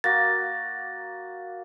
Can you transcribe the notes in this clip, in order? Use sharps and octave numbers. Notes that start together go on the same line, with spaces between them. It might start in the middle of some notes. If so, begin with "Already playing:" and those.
A#3 F#4 A6 A#6